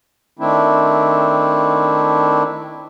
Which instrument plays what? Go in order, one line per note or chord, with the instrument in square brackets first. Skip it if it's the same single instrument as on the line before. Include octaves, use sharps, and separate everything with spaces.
[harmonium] D#3 A3 C4 D4 E4